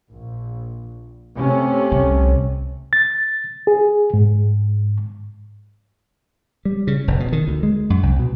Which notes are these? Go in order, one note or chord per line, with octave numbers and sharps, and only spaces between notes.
A#1
C3 A3 C#4
C2
A6
G#4
G#2
G3
C#3
F1
B2
D#3
D2
G#3
F#2
C2
B2